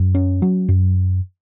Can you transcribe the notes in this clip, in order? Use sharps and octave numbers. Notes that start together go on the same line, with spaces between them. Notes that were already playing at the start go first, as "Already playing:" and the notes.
Already playing: F#2
C#4
F#3
F#2